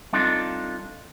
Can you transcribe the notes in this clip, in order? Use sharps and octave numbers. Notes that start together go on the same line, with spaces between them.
G3 C4 D4 D#4 F4 A4